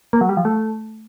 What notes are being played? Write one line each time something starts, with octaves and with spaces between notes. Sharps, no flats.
A#3
F#3
G3
F3
A3